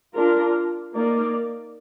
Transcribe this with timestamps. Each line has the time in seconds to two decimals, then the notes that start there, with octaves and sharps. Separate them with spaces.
0.14 D4 F4 A#4
0.93 A#3 D#4 A#4 D5